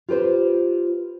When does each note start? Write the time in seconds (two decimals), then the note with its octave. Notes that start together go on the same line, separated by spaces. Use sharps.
0.09 F4 G4 B4 C5